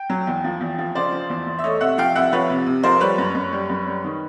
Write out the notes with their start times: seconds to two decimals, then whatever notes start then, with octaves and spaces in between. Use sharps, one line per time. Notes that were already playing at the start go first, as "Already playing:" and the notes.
Already playing: G5
0.10 F#3
0.27 E2
0.44 F3
0.61 E2
0.78 F3
0.95 C#3 C5 D5
1.12 F3
1.30 E2
1.47 E2
1.59 E5
1.64 A3 C#5 D#5
1.81 C3 E5 F#5
1.98 F3 F5 G5
2.15 C2 E5 F#5
2.33 F3 B4 C#5
2.50 C3
2.66 C3
2.83 F3 A#4 C5
3.00 G3 B4 C#5
3.18 F#2
3.35 F#2
3.53 G3
3.69 F#2
3.87 G3
4.04 D#3